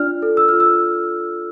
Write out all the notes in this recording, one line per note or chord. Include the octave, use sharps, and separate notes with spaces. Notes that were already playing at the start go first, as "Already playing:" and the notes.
Already playing: D4 F4 D5 F6
A4
E6
F4 F6
E6